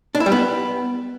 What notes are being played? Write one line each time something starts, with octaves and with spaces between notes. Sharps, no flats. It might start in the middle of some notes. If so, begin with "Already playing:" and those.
D4
E4
G3
B3